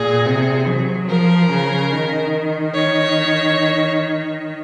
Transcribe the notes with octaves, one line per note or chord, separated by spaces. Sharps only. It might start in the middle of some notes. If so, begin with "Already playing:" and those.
Already playing: A#2 G#4
C3
F#3
F3 A#4
C#3
D#3
C#5